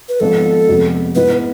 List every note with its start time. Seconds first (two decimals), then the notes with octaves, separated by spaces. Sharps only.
0.09 B4
0.20 G#1 G#2 F3 B3 A4
0.68 F1 F2 C3 G#3 B3
1.15 G#2 G#3 B3 E4 B4